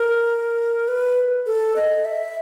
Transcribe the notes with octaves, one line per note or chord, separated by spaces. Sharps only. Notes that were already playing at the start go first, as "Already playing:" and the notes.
Already playing: A#4
B4
A4
D#5
E5